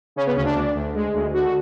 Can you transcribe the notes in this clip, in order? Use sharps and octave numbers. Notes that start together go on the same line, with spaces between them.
C#3 C#4
B3
D2 C#4
D4
D2
D2
G#3
D2
D3 F#4